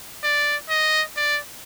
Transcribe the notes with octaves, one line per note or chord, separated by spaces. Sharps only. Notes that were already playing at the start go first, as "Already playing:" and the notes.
D5
D#5
D5